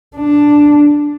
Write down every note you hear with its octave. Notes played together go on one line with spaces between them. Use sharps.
D4